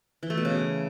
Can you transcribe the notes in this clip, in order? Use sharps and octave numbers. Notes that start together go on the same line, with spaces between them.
E3
A3
B2
C#3